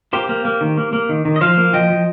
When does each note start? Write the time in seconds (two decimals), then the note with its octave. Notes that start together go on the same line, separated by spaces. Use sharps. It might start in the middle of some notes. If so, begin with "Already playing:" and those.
0.13 A#3 G4 C5
0.29 A#3
0.45 A#3
0.61 D#3
0.77 A#3
0.93 A#3
1.09 D#3
1.25 D#3
1.36 D#5
1.41 F3 C5 F5
1.57 A#3
1.73 F3 D#5 G5
1.90 F3